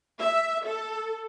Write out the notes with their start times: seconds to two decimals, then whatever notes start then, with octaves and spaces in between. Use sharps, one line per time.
0.19 E5
0.64 A4